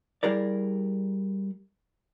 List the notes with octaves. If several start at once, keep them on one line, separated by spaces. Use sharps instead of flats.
G3 E4 G#4 A#4 D5